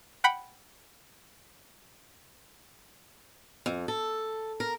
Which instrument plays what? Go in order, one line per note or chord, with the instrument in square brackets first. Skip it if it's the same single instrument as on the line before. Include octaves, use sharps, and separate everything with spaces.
[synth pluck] F#5 G5 B5 C#7
[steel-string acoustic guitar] F2
A4
A#4